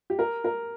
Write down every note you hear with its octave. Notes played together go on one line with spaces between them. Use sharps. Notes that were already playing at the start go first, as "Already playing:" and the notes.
G4
A#4
A#4